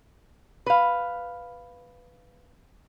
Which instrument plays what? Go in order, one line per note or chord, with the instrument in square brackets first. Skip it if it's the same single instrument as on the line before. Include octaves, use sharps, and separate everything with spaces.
[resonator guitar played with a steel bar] B4 F5